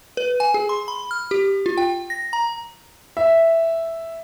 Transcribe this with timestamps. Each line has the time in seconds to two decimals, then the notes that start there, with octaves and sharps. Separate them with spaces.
0.17 B4
0.40 G#5
0.54 G#4
0.69 C6
0.88 B5
1.11 F6
1.31 G4
1.66 F4
1.77 G5
2.10 A#6
2.33 A#5
3.17 E5